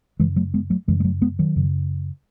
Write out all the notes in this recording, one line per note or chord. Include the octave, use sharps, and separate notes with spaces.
F#2 C#3 E3 G#3
F#3 A3
G#3 B3
F#3 A3
F#2 C#3 E3 G#3
G#3
F#3 A3
G#3 B3
D#3 F#3
F#2 C#3